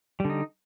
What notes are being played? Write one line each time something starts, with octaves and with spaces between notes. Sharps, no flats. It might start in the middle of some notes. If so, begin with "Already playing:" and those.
D3 G3 D#4